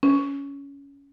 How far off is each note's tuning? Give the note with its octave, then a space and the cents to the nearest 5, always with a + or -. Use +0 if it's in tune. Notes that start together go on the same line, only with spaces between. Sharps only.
C#4 +15